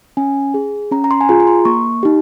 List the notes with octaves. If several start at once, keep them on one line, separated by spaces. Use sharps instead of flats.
C#4 G#5
G#4
C#4 A#5
A#5
C6
G#5
F4 G#4 A#5
A#5
C6
A#3 C#6
D#4 G4